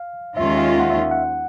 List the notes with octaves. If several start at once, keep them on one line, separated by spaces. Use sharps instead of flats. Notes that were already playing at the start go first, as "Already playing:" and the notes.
Already playing: F5
D#2 D#3 G#3 C#4 F4 E5
F5
F#5
E5
F#5